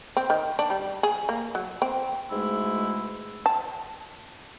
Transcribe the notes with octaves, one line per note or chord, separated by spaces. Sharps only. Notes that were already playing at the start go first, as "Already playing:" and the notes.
C4
D#3
D4
G3
G#4
A#3
F#3
C4
G#2 B2 G#3 A3 E4
A5